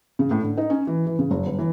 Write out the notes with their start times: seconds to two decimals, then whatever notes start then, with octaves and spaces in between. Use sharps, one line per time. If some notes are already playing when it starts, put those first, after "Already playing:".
0.19 C#3
0.31 A2
0.43 D3
0.58 D#4
0.70 C#4
0.87 E3
1.06 E3
1.19 C#3
1.31 F#1
1.47 G1
1.59 E3